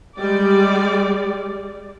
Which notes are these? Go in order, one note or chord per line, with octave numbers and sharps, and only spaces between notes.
G3 G#3 D5